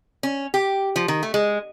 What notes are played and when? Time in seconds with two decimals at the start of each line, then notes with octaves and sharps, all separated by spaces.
0.23 C#4
0.54 G4
0.96 F3
1.08 D#3
1.23 A3
1.34 G#3